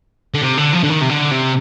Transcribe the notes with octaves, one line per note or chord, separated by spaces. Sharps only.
D3
C3
D3
F3
D3
D#3
C3
D3
C3